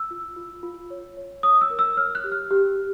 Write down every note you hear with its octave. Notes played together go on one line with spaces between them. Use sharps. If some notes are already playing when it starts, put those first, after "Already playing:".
Already playing: E6
F4
F4
F4
C#5
C#5
C#5 D#6
E6
A#4
E6
C#5 F6
F#6
G4
F6
G4
G4